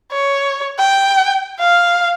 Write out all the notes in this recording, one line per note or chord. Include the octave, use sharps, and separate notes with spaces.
C#5
G5
F5